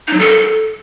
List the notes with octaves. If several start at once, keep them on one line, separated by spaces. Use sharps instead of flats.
D#4
F#3
A4